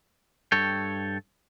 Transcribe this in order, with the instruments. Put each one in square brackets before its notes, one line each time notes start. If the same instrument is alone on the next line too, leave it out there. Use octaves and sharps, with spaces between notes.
[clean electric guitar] G2 A4 C#5 G5